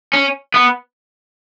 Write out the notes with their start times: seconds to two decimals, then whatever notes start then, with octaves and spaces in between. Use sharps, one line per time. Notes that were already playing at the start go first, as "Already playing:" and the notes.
0.14 C#4
0.54 B3